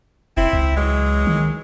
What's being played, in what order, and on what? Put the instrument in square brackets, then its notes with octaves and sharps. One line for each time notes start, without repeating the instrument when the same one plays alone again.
[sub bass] F1 [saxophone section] C4 E4
[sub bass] C#2
[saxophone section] E3 F#3 G#3
[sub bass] D#3